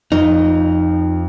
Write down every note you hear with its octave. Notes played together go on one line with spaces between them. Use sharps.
F2 F3 D#4